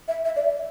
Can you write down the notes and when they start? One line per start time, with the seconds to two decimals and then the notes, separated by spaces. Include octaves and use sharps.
0.08 E5
0.25 E5
0.36 D5